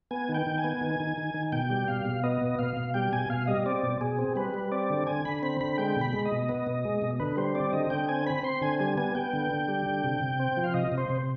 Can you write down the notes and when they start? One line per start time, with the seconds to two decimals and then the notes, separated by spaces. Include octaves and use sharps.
0.11 B3 G#5
0.29 D#3
0.34 G5
0.46 D#3
0.58 G#5
0.64 B3
0.81 D#3
1.00 D#3
1.17 D#3
1.34 D#3
1.52 B2 G5
1.70 G3
1.88 B2 F5
2.05 B2
2.23 B3 D#5
2.42 B2
2.59 B2 F5
2.77 B2
2.94 G3 G5
3.12 B2 G#5
3.30 B2 F5
3.47 G3 D#5
3.66 C4 D5
3.83 B2
4.01 B2 G#4
4.18 C4
4.36 G3 B4
4.54 G3
4.71 C4 D5
4.90 D3
5.07 D3 G#5
5.25 D3 B5
5.43 C4 B5
5.61 D3 B5
5.78 G#3 G5
5.96 B2 B5
6.13 G#3
6.25 D#5
6.32 B2
6.49 B3
6.67 B2
6.85 G#3
7.02 B2
7.20 D3 B4
7.37 G3 C5
7.55 C4 D5
7.73 D3 D#5
7.90 D3 G5
8.09 C4 G#5
8.26 C4 B5
8.44 C4 C6
8.62 D3 G#5
8.79 G3 G#5
8.97 B3 G#5
9.15 B3 G5
9.33 D3
9.51 D3
9.68 G3
9.86 D3
10.04 C3
10.21 C3
10.40 C4
10.57 F3
10.64 F5
10.74 C3 D#5
10.92 C3
10.98 C5
11.10 C3